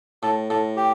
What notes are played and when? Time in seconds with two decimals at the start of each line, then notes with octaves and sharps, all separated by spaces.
0.23 A2 A4
0.50 A2 A4
0.76 G4